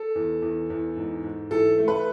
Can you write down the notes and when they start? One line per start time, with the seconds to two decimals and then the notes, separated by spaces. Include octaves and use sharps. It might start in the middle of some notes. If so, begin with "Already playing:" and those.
Already playing: A4
0.15 E2
0.42 E2
0.70 E2
0.97 G#2
1.24 G#2
1.51 E3 A4
1.78 A3
1.88 B4